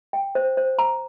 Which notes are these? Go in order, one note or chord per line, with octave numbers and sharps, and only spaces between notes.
G5
C5
C5
A#5